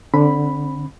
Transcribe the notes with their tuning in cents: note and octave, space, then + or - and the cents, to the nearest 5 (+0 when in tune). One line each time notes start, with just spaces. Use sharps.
D3 +0 C4 +35 B5 +0